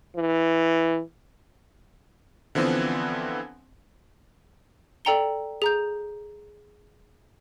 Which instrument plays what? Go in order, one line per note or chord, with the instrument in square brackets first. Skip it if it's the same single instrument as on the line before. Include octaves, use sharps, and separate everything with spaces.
[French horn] E3
[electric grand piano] D3 E3 F3 B3 C4
[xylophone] A4 D5 G5 A#5 C#7 G7
G#4 A#5 G6